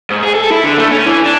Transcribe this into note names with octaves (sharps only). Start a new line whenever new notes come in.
G#2
G#4
A4
E4
D3
A3
C#4
E3
D4